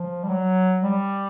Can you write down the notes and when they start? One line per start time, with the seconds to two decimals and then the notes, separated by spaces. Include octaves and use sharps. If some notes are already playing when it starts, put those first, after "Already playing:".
Already playing: F3
0.24 G3
0.30 F#3
0.82 G3